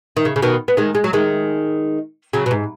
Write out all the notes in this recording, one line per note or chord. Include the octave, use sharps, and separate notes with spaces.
D#3
C#3
C#3
B2 D#3
B3
D#3 G#3
G#3
F#3
D#3 G#3
C#3 F#3
B2
G#2